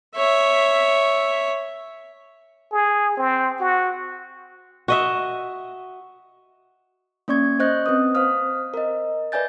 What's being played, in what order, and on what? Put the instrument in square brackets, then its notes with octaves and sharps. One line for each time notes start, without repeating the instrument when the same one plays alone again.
[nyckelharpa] C#5 E5
[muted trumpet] G#4
C4
F#4
[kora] F#4 D#5 E5
[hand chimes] A#3 C#4 D5 C#6 G#6
C5 D#5 C#6 F#6 G6 A#6
C4 B4 D#6
C5 F5 D#6 F6
A#4 D#5
B4 D5 E5 G#5 G6 A6